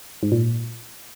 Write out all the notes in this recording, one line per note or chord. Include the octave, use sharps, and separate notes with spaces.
G#2
A#2